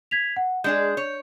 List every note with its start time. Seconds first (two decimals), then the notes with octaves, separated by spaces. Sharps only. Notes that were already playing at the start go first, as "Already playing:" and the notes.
0.11 G#6 B6 F7
0.36 F#5
0.64 G#3 D4 G#4 G6
0.97 C#5